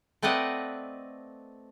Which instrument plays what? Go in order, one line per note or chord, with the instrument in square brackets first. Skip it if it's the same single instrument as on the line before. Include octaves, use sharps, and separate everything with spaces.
[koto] A3 C4 B4 D5 D#5 F#5